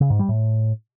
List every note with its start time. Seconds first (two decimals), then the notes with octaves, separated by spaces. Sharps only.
0.01 C#3
0.10 G#2
0.19 G3
0.29 A2